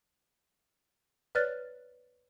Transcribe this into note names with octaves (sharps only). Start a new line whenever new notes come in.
B4 C#5 D5 F6 F#6 A6